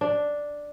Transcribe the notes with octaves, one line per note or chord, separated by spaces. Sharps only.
D4